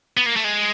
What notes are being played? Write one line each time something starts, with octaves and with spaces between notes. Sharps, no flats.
B3
A#3
A3
G#3